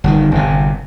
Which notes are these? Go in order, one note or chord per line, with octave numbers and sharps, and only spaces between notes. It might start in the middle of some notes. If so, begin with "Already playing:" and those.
G1 D3 D#3
G1 C3